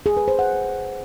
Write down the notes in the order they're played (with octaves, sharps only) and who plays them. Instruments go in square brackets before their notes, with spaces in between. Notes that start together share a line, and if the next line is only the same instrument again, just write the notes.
[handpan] G#4
B4
C5
F#5